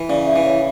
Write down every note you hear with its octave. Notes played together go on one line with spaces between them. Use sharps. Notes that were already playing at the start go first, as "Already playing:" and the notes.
Already playing: E3
C#3 D5
E5
E3
C#5